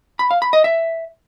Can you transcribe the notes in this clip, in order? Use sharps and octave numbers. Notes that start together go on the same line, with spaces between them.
B5
F5
B5
D#5
E5